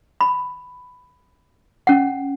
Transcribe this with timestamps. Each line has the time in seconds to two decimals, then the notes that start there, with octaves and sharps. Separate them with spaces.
0.21 B5
1.87 C#4 F#5